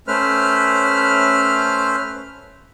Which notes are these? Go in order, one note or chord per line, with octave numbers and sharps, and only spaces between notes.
A3 C#4 B4 C5 F6